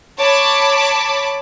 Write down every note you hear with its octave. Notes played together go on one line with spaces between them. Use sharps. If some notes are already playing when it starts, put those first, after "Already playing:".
C#5 A5 B5 D6